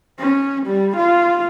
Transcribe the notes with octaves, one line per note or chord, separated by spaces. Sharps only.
C#4
G3
F4